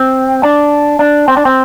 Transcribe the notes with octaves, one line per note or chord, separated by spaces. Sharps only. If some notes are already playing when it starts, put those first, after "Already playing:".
Already playing: C4
D4
D4
C4
D4
C4